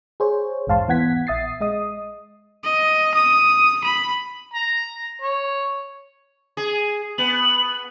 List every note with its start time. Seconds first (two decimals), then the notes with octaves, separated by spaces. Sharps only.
0.20 G#4 C5 C#5
0.67 A#1 E2 G#2 F5 A5 C6
0.88 E3 B3 F#5 G#6 B6
1.27 A#1 E5 D#6 A6 C7
1.61 G#3 D#5 D#6
2.64 D#5
3.15 D#6
3.84 B5
4.53 A#5
5.22 C#5
6.57 G#4
7.18 B3 F#7